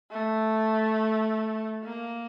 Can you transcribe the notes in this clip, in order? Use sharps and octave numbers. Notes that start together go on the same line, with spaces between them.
A3
A#3